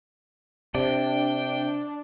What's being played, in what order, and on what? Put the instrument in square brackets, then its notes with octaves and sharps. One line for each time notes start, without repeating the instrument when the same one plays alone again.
[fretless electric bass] C3 [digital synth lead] D4 [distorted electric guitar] G5